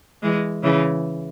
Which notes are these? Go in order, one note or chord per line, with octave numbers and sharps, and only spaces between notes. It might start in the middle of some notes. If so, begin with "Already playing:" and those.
E3 G#3
C#3 E3